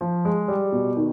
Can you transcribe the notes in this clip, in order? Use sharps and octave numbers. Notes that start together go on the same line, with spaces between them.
F3
G#3
G3
B2
D#3